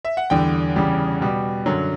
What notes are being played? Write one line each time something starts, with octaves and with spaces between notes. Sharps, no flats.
E5
F#5
E2 D3 G3 G5
E2 C#3 G3
B2 G3
F#2 D3 F#3